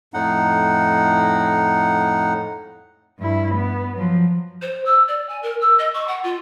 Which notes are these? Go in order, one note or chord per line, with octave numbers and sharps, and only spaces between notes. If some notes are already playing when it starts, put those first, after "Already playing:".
F2 A2 D#4 F#5
G2 E4
B3
F3 F#3
C5
E6
D5
G#5
A#4
E6
D#5
C#6
F#5
F4